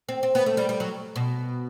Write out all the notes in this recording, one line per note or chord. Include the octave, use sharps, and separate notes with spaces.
C4
C4
B3
A3
G3
G3
F#3
B2